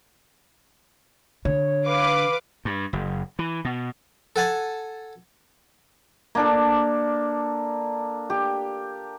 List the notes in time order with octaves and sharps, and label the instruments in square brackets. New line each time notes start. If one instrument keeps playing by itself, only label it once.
[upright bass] D3 [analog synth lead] C#5
[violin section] B4 F5 D6
[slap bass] G2
F#1
E3
B2
[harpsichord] A4 F#5 G#5 A5
[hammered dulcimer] A#3 D4 A4
G4